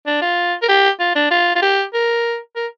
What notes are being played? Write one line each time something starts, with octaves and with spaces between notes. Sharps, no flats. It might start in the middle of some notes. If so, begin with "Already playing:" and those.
D4
F4
A#4
G4
F4
D4
F4
F4
G4
A#4
A#4